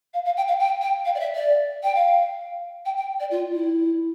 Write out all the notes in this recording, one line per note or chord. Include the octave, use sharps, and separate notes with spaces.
F5
F5
G5
F5
G5
G5
F5
D5
E5
D5
G5
F5
G5
G5
D5
F4
E4